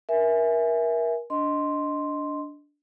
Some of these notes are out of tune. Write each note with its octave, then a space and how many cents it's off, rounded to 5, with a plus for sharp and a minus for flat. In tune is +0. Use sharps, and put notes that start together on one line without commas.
A#4 +30 E5 +0 G#5 +0
D4 -10 D#5 +0 C6 +0